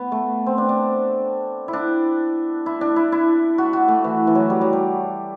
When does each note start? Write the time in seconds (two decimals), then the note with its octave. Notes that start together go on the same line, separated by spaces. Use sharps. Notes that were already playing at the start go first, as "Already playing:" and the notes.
Already playing: B3
0.12 A3
0.46 C4
0.58 D4
0.69 D4
1.68 E4
1.73 D4
2.66 E4
2.81 D4
2.96 E4
3.12 E4
3.58 F#4
3.73 F#4
3.88 A3
4.04 E3
4.27 E3
4.35 F#3
4.50 G3
4.61 F#3
4.73 G3